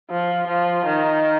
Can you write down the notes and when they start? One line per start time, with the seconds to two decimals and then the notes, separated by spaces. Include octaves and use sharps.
0.10 F3
0.47 F3
0.86 D#3